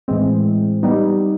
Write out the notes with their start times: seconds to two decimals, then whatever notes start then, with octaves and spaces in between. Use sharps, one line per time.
0.08 A2 E3 G#3 C4
0.83 G3 B3 D#4